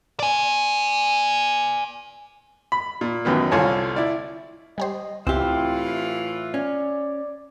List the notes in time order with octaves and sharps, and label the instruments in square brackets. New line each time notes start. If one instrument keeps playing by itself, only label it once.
[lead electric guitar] D5 G#5
[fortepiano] B5
A#2
A1 F#2 B2 D#3 B4
C2 D3 F4 C#5 G#5 A5
E4 D5
[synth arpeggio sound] G3 G4 C5 [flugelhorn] D#5
[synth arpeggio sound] C#2 [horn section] A2 E3 F4 [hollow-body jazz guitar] C4 G4 [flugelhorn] E4
[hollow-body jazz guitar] C#4 [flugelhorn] D5